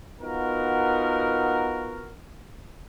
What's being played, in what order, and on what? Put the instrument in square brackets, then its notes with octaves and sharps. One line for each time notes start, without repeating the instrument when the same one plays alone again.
[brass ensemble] B3 D#4 F4 F#4 A#4